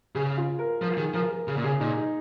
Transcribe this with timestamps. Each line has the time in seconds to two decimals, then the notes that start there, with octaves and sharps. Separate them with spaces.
0.15 C#3 G#4
0.38 F4
0.59 A#4
0.82 F3 A#4
0.97 D#3 G#4
1.14 F3 A#4
1.31 A#4
1.48 C#3 G#4
1.57 A#2
1.64 C#3 G#4
1.80 A#2 D#4
1.97 D#4